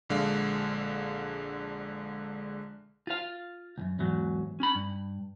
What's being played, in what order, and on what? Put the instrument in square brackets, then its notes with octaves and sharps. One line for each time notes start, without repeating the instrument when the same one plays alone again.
[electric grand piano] A#1 D3 G#3 F5
[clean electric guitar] F4 F5
C#2 F#2
E2 G#2 F#3
C#4 B5
G2